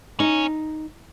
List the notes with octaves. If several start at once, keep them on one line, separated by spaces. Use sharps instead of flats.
C#4 D#4